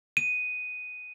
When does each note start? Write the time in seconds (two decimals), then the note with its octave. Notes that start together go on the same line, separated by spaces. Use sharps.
0.17 D#7